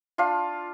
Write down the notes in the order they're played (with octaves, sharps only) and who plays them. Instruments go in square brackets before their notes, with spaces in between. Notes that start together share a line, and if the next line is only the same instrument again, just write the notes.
[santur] D4 F4 [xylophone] F5